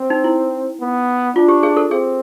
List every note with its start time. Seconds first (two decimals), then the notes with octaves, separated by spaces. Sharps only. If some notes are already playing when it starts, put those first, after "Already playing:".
Already playing: C4
0.10 D#4
0.24 E4
0.80 B3
1.35 D4 F4
1.48 G4
1.63 G#4
1.77 A4
1.91 C4 G#4